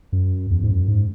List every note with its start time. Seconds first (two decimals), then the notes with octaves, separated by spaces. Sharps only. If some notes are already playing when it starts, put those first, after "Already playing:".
0.12 F#2
0.50 E2
0.64 G#2
0.70 F#2
0.88 G#2